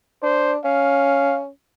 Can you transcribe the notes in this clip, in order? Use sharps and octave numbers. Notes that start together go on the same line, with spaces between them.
D4 C5
C#4 F5